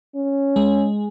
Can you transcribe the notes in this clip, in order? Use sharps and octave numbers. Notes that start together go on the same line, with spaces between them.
C#4
G#3